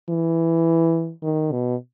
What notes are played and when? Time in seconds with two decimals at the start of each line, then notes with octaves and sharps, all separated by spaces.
0.10 E3
1.23 D#3
1.52 B2